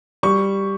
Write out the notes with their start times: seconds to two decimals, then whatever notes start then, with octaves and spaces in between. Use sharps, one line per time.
0.23 G3 C#6